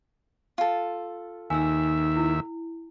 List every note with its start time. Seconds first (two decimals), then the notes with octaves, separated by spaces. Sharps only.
0.58 F4 A4
1.50 D#2 D#4 E5 G#5 E6
2.16 E4